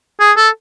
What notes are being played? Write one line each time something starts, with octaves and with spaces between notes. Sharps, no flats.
G#4
A4